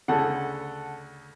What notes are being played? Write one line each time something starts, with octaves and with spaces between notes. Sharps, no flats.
D2 C#3 A4 F#5